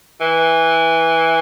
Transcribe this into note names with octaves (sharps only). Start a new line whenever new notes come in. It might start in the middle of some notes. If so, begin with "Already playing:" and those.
E3